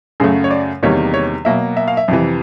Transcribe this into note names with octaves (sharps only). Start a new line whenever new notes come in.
F#2 C#3 F#3 A3 G#4
C#5
D5
E2 C3 D#3 G3 A#3 C#5
C#5
B2 F#3 A#3 E5
E5
F5
E5
F2 C3 E3